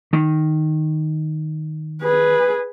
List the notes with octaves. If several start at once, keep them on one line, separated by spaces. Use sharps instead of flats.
D#3
G#4 B4